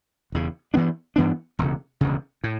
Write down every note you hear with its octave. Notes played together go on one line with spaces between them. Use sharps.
E1 E2 C#3
G2 E3 B3 D4
G2 E3 B3 D4
E1 D2 C#3
E1 D2 C#3
A2